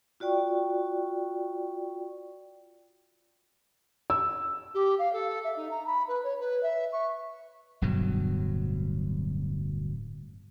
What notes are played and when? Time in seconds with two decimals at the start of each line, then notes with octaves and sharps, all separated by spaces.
0.20 F4 F#4 D5 G5 C#6
4.10 E6
4.74 G4
4.99 F5
5.13 A4
5.44 E5
5.56 D#4
5.71 A#5
5.86 B5
6.08 B4
6.23 C#5
6.40 B4
6.63 E5
6.92 C#6
7.82 D1 G2 B2 F#3